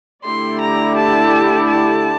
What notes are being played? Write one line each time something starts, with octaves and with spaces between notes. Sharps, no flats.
D3 A3 E4 G4 D5 C6
A#5
A5
A5